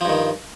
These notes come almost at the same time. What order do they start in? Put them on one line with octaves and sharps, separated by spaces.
F3 G2 D#3